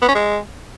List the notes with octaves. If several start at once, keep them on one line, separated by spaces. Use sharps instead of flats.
B3
C#4
G#3